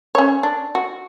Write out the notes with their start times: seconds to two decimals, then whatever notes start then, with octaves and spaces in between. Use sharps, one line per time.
0.15 C#4 C#5
0.43 D4
0.75 F#4